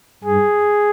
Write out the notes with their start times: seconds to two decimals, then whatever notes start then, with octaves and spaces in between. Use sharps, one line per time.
0.24 G2 G#4